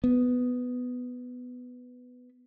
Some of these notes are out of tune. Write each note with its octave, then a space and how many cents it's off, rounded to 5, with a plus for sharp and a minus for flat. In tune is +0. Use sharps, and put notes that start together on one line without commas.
B3 +10